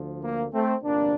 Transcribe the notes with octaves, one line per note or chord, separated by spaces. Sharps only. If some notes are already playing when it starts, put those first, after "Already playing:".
Already playing: D2 D3 F3
A#3
A3 C4
G1 F2 C3 F3 A#3 D4